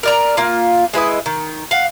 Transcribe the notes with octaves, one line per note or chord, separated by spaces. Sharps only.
A#4 D5 A#5
A#3 F4
G#3 E4 B4 D#5
D#3
F5 F#5